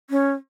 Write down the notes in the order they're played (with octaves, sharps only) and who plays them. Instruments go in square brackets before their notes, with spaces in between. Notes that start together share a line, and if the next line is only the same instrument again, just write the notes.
[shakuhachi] C#4